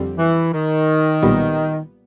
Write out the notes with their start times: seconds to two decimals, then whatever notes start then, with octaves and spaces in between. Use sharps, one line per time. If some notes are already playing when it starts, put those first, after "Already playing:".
Already playing: F2 D3 G3 C4
0.18 E3
0.53 D#3
1.23 B1 A#2 G3 B3